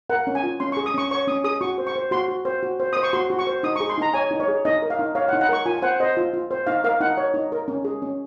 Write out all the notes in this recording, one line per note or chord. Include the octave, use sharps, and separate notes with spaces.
A#4 F#5
C#4
G#5
F4
C#4 C6
C#6
G#4
D#6
C#4 C#6
C#5 C#6
C#4 D#6
G#4 D#6
F#4 C#6
C5
C#6
C5
F#4 C6
F#4
C5
F#4
C5
C5 D#6
C#6
F#4 C6
F#4
C#6
C5
D#4 D#6
C#6
G#4
C6
D#4 A#5
C#5 G#5
D#4
C#5
G#4
D#4 D#5
A#4
F5
D#4
C#5 F5
F#5
D#4
F#5
A#4 C#6
F4 G#5
G#5
C5 F#5
C5 D#5
F4
F4
C5
D#4 F5
A#4 F5
D#4 F#5
C#5
D#4
A#4
C#4
G#4
C#4